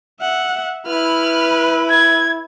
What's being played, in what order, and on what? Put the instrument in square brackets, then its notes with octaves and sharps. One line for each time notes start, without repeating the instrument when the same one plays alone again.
[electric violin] E5 F#5
[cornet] E4 [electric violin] B4 B5 [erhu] F6
[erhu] G#6